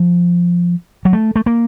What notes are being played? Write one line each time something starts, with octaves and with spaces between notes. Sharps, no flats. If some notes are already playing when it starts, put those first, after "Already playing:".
Already playing: F3
F#3
A3
A3
A#3